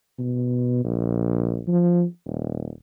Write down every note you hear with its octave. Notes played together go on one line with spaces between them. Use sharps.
B2
A#1
F3
D#1